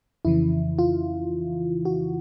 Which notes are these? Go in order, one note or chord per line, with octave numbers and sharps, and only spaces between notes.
F2 C#3 E3 E4
F4
F#4